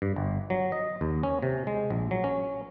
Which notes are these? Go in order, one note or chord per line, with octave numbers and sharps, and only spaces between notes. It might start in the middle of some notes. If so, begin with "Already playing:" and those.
G2
G1
F#3
D#5
D#2
C#4
C3
G#3
A#1
F#3
C#4